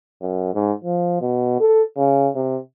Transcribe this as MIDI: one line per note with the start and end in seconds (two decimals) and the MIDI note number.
0.22 0.52 42
0.54 0.72 44
0.85 1.20 53
1.21 1.57 47
1.60 1.83 69
1.97 2.29 49
2.36 2.59 48